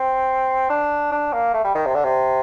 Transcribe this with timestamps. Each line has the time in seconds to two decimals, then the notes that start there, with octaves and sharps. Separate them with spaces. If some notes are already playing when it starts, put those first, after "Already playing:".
Already playing: C4
0.70 D4
1.12 D4
1.33 A#3
1.54 A3
1.65 G3
1.75 D#3
1.86 C3
1.95 D3
2.04 C3